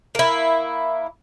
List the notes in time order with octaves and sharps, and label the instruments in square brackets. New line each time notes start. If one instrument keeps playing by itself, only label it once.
[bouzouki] A#3 E4